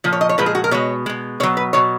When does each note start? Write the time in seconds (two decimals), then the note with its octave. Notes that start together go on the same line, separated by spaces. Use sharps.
0.04 A#2 F3
0.13 C#5
0.21 D#5
0.29 C#5
0.38 A#2 F3 G#3 B4
0.46 G#4
0.55 F#4
0.64 A#4
0.71 B2 G#3 C#5
1.06 B2 G#3
1.40 B2 C#5
1.43 F#3
1.57 B4
1.73 B2 F#3 C#5